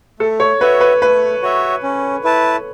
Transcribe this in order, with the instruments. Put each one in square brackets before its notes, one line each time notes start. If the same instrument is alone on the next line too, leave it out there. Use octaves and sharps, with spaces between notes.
[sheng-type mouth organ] A3 [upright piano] A4
[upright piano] C#5
[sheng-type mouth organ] F#4 C#5 E5 [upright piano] B4
[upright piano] B4
[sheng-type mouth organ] A3 [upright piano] B4
[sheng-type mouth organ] F#4 C#5 E5
C#4
E4 B4 A5